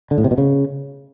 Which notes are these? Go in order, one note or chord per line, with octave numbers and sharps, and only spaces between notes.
D3
A2
C3
B2
C#3